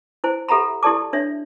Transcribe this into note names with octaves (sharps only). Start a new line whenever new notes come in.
E4 C5 G#5
G4 A4 E5 F#5 A#5 B5
E4 G4 A4 D5 A5 D6
D4 C#5 E5